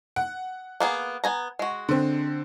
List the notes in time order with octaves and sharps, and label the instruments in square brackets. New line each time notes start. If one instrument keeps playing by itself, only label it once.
[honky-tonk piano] F#5
[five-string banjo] A#3 B3 G#4
B3 G#5 A#5
G#3 F#4
[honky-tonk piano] D3 C4